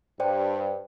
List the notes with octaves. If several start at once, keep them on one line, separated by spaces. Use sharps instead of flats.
G2 C5 D5 G5